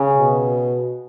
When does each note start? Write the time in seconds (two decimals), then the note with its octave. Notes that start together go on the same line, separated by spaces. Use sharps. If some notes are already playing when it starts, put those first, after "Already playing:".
Already playing: C#3
0.18 B2